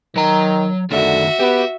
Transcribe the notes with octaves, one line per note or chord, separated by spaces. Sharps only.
D#3 F#3 A#5
D3 D#3 A3 F#4 E5
B3 G4